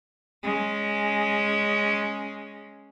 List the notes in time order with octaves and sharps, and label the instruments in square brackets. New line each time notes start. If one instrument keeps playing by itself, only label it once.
[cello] G#3 C#4